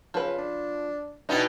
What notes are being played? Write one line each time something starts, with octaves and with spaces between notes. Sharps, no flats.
C#3 F3 B4
D4
B2 E3 B3 D4 D#4 G#4 G5